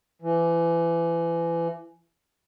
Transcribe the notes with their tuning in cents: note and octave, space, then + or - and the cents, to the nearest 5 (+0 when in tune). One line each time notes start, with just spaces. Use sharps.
E3 +30